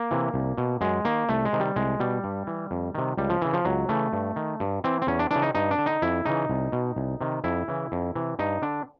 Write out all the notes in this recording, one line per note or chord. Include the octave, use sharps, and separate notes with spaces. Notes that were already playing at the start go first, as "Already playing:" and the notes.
Already playing: A#3
C3 E3
C2
B2
F#2 G#3
D#3 A#3
C2 A3
G#3
C3 D#3
G3
C2 G#3
B2 G3
G2
E3
F2
C3 D#3
C#2 G3
F3
C#3 E3
F3
C#2 F#3
C#3 E3 A3
G2
D#3
G2
E3 C4
C4
E2 C#4
D4
C#3 E3 D4
D#4
G2 D#4
D4
D3
D#4
F2 E4
C#3 E3 D#4
C2
B2
C2
C3 D#3
F2 E4
C#3 E3
F2
C3 E3
G2 D#4
D3 D4